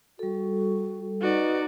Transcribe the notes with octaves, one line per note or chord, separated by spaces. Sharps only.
G3 F#4 A4
D#4 F#4 B4 D5